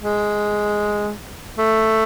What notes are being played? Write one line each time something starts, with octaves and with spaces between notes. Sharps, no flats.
G#3
A3